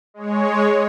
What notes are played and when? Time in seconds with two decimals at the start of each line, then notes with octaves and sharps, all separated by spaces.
0.14 G#3 C#5